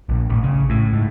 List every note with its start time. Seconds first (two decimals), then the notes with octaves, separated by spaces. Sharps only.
0.09 A#1
0.30 A1
0.43 C#3
0.70 A2
0.93 G#2